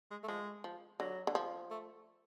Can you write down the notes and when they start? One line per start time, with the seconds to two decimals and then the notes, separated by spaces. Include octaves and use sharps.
0.11 G#3
0.24 A3
0.28 F3 G#3
0.64 F3
1.00 D3 F#3
1.27 D3
1.35 F3
1.71 A3